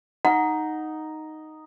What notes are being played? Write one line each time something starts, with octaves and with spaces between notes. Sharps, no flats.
D#4 F#5